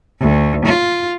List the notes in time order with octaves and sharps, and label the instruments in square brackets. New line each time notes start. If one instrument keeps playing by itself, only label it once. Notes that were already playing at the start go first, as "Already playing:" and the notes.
[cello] D2
F4